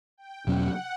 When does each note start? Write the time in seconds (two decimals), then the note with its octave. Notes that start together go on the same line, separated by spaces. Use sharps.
0.18 G5
0.47 E2 B2 F#3 C#4 F#5